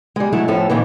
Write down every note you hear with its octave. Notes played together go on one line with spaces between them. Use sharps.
G3 G#3
F#3 G#3 A3 E4
A2 F3 C#4 A4
F2 A#2 D#3 E3